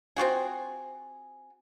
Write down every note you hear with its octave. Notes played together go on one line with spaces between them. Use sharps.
C4 F4 F#4 G#4